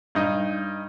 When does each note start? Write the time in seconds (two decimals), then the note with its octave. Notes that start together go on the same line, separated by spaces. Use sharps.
0.15 G2 D#4